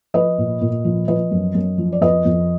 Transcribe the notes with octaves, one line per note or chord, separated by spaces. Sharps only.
F3 B4 D#5
A#2
A#2
F3
F3 B4 D#5
F#2
F#2
F3
D5
F2 B4 D#5
F2